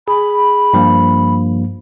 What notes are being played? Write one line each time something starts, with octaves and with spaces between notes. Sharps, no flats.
G#4 B5
G2 F3 A#3